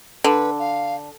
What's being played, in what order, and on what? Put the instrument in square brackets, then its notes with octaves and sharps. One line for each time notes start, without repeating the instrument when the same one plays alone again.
[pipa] D3 [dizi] B4
[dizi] F5